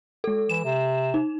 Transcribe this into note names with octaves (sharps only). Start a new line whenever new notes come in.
G#3 A4
E3 E7
C3
D#4